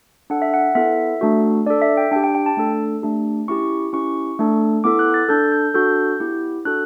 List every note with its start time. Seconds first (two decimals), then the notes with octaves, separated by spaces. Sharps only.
0.30 D4 A4 F#5
0.42 E5
0.54 F#5
0.75 B3 E4 A4 E5
1.21 A3 D4 F#4 A4
1.66 D4 A4 D5
1.82 E5
1.97 G5
2.11 D4 G5
2.16 G4
2.24 G5
2.35 G5
2.46 A5
2.57 A3 D4 A4
3.02 A3 D4 G4
3.48 C#4 E4 G4 C#6
3.93 C#4 E4 G4 C#6
4.39 A3 D4 A4
4.84 B3 E4 A4 D6
4.99 F#6
5.14 A6
5.29 D4 A4 G6
5.52 G6
5.74 D4 F#4 A4 G6
6.20 B3 E4 G4
6.65 D4 F#4 A4 F#6